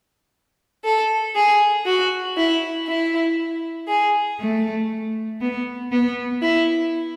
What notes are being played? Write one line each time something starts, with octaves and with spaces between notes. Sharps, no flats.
A4
G#4
F#4
E4
E4
G#4
A3
B3
B3
E4